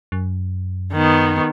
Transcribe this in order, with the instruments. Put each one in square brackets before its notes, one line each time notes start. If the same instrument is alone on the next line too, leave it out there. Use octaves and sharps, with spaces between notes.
[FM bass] F#2
[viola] D#3 B3